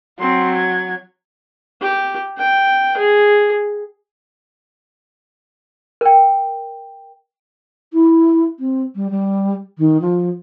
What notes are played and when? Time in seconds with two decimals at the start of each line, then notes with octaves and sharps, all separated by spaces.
0.20 F#3 C4 C6
0.56 G#6
1.81 G4
2.38 G5
2.97 G#4
6.01 A#4 G5
7.93 E4
8.59 C4
8.95 G3
9.11 G3
9.78 D#3
10.01 F3